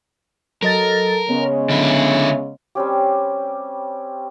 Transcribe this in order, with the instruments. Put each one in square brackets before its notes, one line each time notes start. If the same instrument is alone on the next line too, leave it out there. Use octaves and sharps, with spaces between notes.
[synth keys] F#3 D#5 A6 [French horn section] A4 [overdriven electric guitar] A#4
[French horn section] C#3 G#3 C#4 [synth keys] B3
[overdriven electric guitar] D3 E4
[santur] G3 C4 C#4 G4